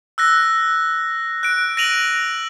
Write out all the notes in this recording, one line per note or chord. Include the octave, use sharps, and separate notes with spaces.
E6 F#6 A#6
F#6 D7
A#6 D7 D#7 F7 F#7